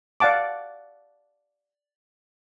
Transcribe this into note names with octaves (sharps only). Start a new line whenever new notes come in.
D5 F5 F#5 A5 D6